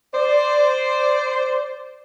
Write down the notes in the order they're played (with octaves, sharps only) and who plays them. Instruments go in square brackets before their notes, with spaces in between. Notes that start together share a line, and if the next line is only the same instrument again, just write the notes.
[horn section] C5 D5